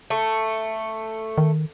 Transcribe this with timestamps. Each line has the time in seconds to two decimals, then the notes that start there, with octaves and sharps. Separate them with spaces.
0.10 A3
1.38 D#3